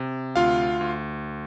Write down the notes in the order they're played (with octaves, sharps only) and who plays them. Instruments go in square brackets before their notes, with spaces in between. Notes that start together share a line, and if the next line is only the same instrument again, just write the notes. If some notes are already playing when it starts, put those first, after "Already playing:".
Already playing: [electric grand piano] C3
D2 F4 F5
D2